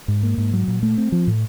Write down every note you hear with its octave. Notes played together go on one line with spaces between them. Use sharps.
G#2
A#3
G#2
F#3
A#2
A3
C4
F3
A2